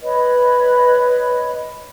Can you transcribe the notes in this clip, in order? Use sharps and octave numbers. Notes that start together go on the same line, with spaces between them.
B4 C#5 D#5 B5